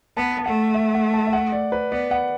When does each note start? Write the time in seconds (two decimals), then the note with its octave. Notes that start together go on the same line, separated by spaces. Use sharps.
0.16 B3 A5
0.38 A5
0.46 A3 F#5
0.74 E5
0.95 F#5
1.14 A5
1.27 E5
1.33 F#5
1.52 D5
1.72 B4
1.91 B3 D5
2.11 F#5